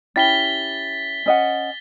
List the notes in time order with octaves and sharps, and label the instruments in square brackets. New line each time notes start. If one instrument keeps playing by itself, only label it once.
[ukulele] C#4 E4 G4 [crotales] A6 B6 G7
[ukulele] C#4 D#5 F#5